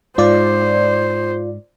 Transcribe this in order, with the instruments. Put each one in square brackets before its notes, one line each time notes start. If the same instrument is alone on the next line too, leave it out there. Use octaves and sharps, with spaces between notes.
[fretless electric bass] G#2 [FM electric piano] F4 D5 [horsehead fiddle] C5